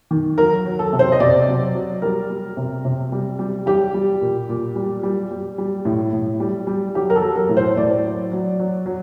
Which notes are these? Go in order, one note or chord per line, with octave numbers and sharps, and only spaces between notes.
D#3
F#3 A#4
F#3
A4
C3
C5
D#5
C3 D5
F#3
F#3
G3 A#4
G3
C3
C3
G3
G3
G3 G4
G3
A#2
A#2
G3
G3
G3
G3
A2
A2
G3
G3
F#3 G4
A#4
A4
F#3
A#4
A2
C5
A2 D5
F#3
F#3
F#3
F#3